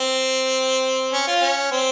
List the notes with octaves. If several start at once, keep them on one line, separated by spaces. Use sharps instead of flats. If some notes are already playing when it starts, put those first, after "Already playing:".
Already playing: C4
C#4
F4
C#4
C4